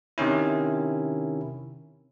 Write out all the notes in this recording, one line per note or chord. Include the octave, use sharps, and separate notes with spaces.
C3 D#3 C#4 E4